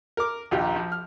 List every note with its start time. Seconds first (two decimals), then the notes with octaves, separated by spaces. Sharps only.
0.17 A#4 D6
0.51 A#1 D#2 F4 G4
0.76 F3
0.92 F6